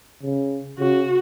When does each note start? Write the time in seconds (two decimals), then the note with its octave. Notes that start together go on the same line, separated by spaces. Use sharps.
0.23 C#3
0.79 C#3 F#4